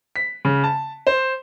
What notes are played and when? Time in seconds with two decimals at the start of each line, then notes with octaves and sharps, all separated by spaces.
0.16 B6
0.45 C#3
0.64 A5
1.07 C5